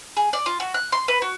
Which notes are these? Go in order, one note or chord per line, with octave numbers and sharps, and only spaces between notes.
G#4
D5
F4
F#4
F#6
C6
B4
F#4